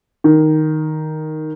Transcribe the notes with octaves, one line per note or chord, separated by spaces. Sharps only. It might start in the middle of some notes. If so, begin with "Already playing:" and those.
D#3